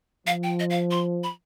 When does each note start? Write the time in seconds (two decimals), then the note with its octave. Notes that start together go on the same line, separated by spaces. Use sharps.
0.27 F3 F5
0.43 G5
0.60 D#5
0.70 F5
0.91 C6
1.24 B5